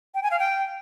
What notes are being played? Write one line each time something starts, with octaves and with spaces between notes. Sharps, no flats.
G5
G#5
F5
G5